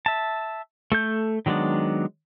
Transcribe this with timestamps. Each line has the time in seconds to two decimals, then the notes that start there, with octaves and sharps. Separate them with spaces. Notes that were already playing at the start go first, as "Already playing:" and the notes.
0.06 E5 A5
0.92 A3 A4 G6
1.46 D#3 F#3 G#3 B3 D4